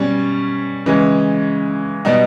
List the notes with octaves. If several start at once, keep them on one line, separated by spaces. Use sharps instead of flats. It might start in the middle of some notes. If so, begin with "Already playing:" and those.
Already playing: B2 G3 C#4
C#3 E3 G#3 C#4
B2 G3 B3 D#4